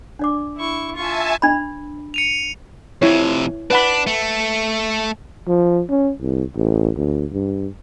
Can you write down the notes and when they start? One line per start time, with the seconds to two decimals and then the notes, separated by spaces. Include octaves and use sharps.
0.19 D4 D5 D6
0.58 E4 C#6
0.96 F4 E5 G#5 A5 C#6
1.42 D4 B5
2.14 C#7 D#7 F7
3.02 F2 C3 E4 C#5
3.70 D4 B4 F#5 B5
4.07 A3
5.48 F3
5.89 C#4
6.21 C2
6.56 A1
6.97 D2
7.32 G2